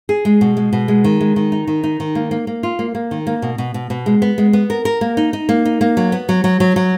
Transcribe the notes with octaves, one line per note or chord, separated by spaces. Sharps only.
G#4
G#3
B2
G#3
B2
G#3
D#3
G#3
D#3
D#4
D#3
D#4
D#3
A#3
A#3
A#3
F4
A#3
A#3
D#3
A#3
B2
B2
B2
B2
G#3
B3
G#3
B3
A#4
A#4
A#3
D#4
D#4
A#3
D#4
A#3
F#3
B3
F#3
F#3
F#3
F#3